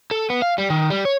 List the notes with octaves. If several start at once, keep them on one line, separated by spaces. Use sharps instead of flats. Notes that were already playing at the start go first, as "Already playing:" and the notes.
A4
B3
F5
G3
D#3
G3
C#5